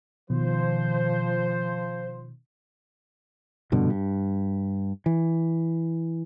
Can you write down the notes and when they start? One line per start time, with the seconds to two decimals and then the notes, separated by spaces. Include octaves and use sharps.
0.30 B2 D#3 F3 C5
3.72 F1 G2 B2 D3
3.90 G2
5.06 E3